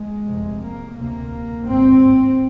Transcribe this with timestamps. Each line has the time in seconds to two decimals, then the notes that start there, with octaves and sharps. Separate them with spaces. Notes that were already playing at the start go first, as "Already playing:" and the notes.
Already playing: G#3
0.27 F1 F2 C3
0.61 A#3
0.95 D2 C3 A#3
1.65 G#1 G2 C4